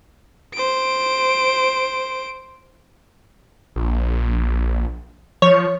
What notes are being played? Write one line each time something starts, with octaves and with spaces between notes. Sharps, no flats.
C5 D7
A#1
F3 C#5